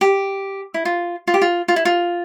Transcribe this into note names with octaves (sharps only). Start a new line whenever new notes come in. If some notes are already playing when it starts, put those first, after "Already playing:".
G4
E4
F4
F4
G4
F4
F4
E4
F4